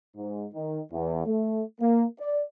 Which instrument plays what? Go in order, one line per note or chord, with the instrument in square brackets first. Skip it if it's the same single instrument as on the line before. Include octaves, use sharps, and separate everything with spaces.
[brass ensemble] G#2
D#3
E2
A3
A#3
D5